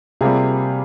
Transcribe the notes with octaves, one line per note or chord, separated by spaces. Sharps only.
C3 G3 A#3 F4 G#4